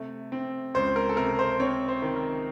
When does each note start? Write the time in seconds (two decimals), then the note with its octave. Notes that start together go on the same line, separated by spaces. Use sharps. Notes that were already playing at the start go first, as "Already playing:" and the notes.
Already playing: C3 A3
0.32 C4
0.74 C#2 C5
0.96 A#4
1.09 A4
1.17 C3 A#4
1.39 C5
1.60 C4 C#5
1.88 C5
2.02 D#3
2.16 A#4